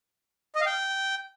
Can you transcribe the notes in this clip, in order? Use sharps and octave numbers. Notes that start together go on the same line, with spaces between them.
D#5
F5
G5